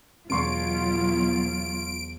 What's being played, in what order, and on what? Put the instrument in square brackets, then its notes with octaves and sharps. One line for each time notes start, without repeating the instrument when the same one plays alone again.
[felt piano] E1 C6 C#6 [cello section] B2 F#3 F4 [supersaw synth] D7